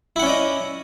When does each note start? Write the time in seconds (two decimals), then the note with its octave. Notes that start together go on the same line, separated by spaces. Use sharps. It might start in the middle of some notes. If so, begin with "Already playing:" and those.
0.16 E4
0.19 F#5
0.23 C#4
0.26 D5
0.29 D#5